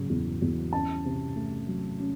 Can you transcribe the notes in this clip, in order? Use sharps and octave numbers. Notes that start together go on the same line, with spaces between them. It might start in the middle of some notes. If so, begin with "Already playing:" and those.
Already playing: C#3 F#3
E2
E2
C#4 A5
C3
A3
F#3
C#4